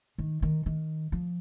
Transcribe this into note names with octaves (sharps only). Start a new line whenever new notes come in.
D#3
D#3
D#3
F3